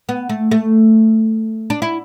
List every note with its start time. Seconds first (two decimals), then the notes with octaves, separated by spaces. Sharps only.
0.09 B3
0.29 A3
0.51 A3
1.70 D4
1.82 E4